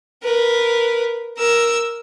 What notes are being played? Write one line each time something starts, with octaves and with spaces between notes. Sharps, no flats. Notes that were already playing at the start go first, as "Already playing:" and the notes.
A#4 B4
A#4 E6